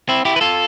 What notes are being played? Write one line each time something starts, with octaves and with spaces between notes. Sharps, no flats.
C4 E4
E4 G4
B4
F4 A4